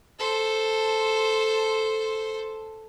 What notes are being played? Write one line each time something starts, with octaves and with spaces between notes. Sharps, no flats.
A4 C5